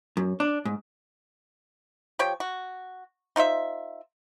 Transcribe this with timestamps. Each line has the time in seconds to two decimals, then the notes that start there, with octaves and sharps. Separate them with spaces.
0.17 F#2
0.40 D4
0.65 G#2
2.19 F3 G4 C#5 G5
2.40 F#4
3.36 D#4 F4 C5 E5